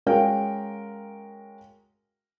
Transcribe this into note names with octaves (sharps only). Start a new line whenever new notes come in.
G#3 C#4 F#4 A#4 F5 G5